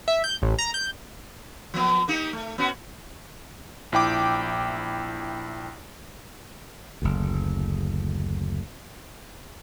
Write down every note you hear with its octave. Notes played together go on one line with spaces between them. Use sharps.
E5
G6
A1
A#5
G6
F3 A#3 B3
A#3 D#4 G4
A3
B3 C#4 F#4
A#1 E4 G5 D6
F#1 D2